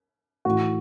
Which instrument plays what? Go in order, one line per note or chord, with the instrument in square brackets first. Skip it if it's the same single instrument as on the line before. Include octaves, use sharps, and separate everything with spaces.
[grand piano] A2 E3 F#4